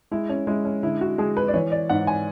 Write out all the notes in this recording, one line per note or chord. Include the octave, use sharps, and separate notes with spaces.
G#3 E4
C#4
G#3 E4
C#4
D3 E4
F#4
G#3 G#4
B4
D5
E3 C#5
D5
G#2 F#5
G#5